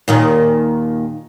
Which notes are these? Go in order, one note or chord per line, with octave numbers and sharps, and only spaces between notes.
D#2 A#2 D#3